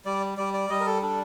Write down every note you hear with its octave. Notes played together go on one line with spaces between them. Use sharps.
G3 D5
G3 D5
D5
G3 D#5
A#4
A4
D4 A4